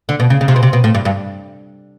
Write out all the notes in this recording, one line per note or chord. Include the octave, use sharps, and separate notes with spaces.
D3
B2
C#3
C#3
C3
B2
C3
B2
A2
G2
G2